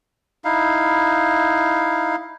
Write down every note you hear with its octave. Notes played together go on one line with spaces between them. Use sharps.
D#4 E4 F5